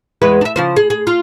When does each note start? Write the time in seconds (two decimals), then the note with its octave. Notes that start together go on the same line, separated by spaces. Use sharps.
0.22 E2 G#3 B4
0.41 D4 E5
0.56 C#3 F3 C5
0.76 G#4
0.90 G#4
1.07 F4